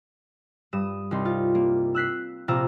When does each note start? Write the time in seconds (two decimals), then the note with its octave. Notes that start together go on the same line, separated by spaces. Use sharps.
0.73 G2 D#6 E7
1.11 C2 D#4 C6
1.25 F4
1.55 A#3
1.95 E6 F#6 B6 C7
2.48 A#1 C3 F4 A#5 E6